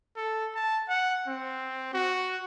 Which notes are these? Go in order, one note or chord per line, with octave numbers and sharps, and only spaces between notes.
A4
A5
F#5
C4
F#4